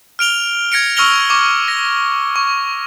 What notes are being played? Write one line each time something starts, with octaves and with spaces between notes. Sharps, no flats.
F6 D7 F7 G7
G#6 A#6 C#7 D7
C#6 E6 F6 A#6 F7 G7
C#6 D6
A#6
C#6